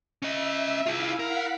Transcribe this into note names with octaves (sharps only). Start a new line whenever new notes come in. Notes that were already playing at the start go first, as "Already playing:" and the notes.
C#4 D#5 E5
E4 F4 G#4 F5
A#4 F5 F#5 B6